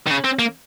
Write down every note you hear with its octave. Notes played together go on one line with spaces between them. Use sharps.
D#3
C#3
C4
A#3